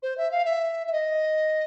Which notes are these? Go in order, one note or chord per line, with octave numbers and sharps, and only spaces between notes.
C5
E5
F5
E5
E5
D#5